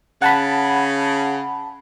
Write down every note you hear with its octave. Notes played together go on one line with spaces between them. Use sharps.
C#3 F#5 A5 B5